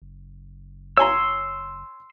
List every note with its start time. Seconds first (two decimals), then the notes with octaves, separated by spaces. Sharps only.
0.02 F#1
0.97 C#5 G#5 A#5 C6 E6